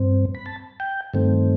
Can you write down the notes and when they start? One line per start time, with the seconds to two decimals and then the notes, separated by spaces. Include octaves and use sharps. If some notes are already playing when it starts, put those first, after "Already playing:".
Already playing: G2 C4
0.35 B5
0.46 A5
0.80 G5
1.14 G2 D#3 A3 C4